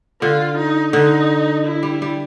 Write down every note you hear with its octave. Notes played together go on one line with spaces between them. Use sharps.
D3 F4
D#4
D3 D#4
E4
G3
G3